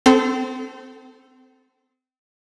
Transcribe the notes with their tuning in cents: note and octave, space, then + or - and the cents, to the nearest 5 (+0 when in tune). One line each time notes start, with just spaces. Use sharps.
C4 -30 A4 +0 C5 +0